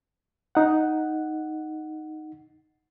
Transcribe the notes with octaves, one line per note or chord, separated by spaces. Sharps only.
D#4 F#5